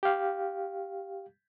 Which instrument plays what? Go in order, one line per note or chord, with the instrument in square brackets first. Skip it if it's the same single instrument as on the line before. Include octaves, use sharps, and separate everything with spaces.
[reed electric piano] G4 F5